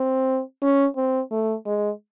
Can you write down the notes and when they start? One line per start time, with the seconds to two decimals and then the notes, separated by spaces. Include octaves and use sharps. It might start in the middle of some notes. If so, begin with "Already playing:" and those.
Already playing: C4
0.62 C#4
0.96 C4
1.31 A3
1.66 G#3